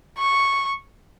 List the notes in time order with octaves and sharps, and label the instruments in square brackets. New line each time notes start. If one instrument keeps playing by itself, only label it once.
[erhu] C#6